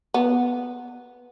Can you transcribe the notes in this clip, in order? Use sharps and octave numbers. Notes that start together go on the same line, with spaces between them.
B3